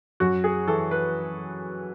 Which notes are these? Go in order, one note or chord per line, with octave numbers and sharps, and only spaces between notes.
F#2 F#4
G#4
E3 A4
B4